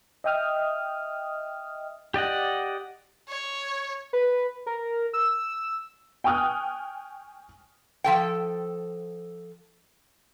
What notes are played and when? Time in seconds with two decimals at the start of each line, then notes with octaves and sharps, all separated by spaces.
0.24 D#5 E5 G5 D#6 F6
2.14 G4 D5 D#5 F#5
3.29 C#5
4.13 B4
4.66 A#4
5.13 E6
6.24 G5 G#5 C#6 D#6 F6 F#6
8.04 F3 A4 G5